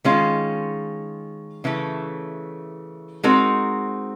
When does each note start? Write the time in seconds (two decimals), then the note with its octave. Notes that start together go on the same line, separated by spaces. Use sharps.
0.04 D#3 G#3 C#4 F4
1.64 C#3 E3 A3
3.23 G#3 C4 D#4 F#4 A#4